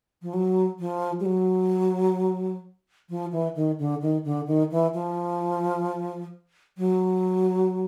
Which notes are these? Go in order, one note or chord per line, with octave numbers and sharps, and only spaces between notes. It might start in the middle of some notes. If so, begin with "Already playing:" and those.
F3
F#3
F3
G3
F#3
F3
E3
D#3
D3
D#3
D3
D#3
E3
F3
F#3